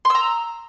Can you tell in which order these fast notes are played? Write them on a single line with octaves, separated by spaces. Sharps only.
C6 E6 A#5